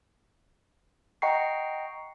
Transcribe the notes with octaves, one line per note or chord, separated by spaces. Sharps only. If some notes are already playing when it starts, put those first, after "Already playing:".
D#5 F#5 G5 A#5 C#6 C7